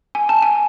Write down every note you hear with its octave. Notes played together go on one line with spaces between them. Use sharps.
G#5
A5
G#5